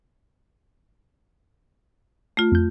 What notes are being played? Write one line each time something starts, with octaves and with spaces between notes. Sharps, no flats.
A3 F4
F2 G6